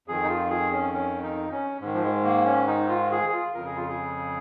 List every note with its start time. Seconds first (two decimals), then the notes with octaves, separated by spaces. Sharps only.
0.08 F2 D#3 G#4
0.24 D#4
0.28 F4
0.50 G#4
0.72 C#4
0.94 C#4
1.23 D#4
1.52 C#4
1.80 G#2 D#3
1.94 F3
2.03 G#3
2.24 A#3
2.46 C#4
2.67 D#4
2.89 F4
3.11 G#4
3.29 G#4
3.33 F4
3.54 F2 C#3 A#4
3.66 G#4
3.77 F4
3.89 G#4